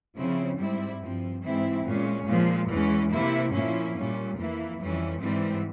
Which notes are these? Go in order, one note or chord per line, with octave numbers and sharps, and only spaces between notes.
C#3 F3 C4 E4
G#2 G3 C4 E4
G2 F3 C4
G#2 E3 G#3 C4 E4
A#2 G#3 C#4
A#2 F3 G#3
E2 E3 G#3 C#4
C3 E3 A#3 E4
A#2 F3 A#3 C#4 E4
A#2 G3 C#4
F2 E3 A#3 E4
F2 E3 G3 C#4
G#2 E3 G3 C4